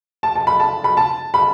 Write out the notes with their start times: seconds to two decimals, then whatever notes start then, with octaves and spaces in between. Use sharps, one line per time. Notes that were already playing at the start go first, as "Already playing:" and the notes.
0.23 A5
0.36 A5
0.47 B5
0.60 A5
0.84 B5
0.97 A5
1.34 B5